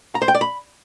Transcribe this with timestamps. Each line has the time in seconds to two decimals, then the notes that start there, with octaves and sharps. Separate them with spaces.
0.15 A#5
0.22 C5
0.28 G5
0.35 D5
0.41 B5